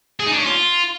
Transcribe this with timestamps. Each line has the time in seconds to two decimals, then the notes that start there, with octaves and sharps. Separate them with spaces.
0.20 G#4
0.26 D#4
0.33 D4
0.39 C#4
0.45 F4